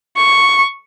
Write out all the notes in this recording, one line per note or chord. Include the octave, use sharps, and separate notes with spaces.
C#6